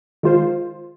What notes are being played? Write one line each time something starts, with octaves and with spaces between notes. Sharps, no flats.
D#3 G#3 F4 C5